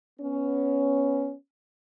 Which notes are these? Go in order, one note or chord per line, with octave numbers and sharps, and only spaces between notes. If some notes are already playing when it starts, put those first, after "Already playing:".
B3 C#4